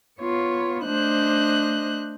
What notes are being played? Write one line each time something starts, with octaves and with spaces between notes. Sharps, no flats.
B3 F4 C#5
A3 D4 C5 D#5 F#6